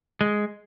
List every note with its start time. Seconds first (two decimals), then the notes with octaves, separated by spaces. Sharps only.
0.21 G#3